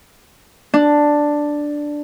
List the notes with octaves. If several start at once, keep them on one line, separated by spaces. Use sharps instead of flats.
D4